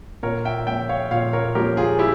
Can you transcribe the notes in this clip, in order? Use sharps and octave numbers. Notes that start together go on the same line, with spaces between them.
A#2 A#4 C#5
E5 G5
F3 A#3 C#4 E5 G5
C#5 F5
A#2 C#5 F5
A#4 C#5
F3 A#3 C#4 G4 A#4
F4 G#4
E4 G4